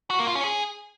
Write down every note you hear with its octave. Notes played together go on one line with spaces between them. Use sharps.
F#4
A#3
F4
C#4
G#4